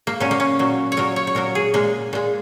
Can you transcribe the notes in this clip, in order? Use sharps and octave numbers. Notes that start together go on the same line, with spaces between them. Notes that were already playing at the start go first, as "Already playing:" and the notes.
A#3
A#2 F#3 C#4
A#3
C#4
A#2 F#3
C#5
A#2 F#3 A#4
C#5
C#5
A#2 F#3 A#4
G#4
A#2 G#3 A#3
A#2 G#3